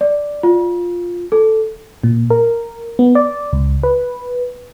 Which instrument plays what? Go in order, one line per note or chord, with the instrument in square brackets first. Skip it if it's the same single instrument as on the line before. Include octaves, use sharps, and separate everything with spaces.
[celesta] D5
F4
A4
[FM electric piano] A#2
A#4
B3
D5
C#2
B4